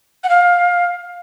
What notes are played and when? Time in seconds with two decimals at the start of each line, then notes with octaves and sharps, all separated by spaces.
0.24 F#5
0.29 F5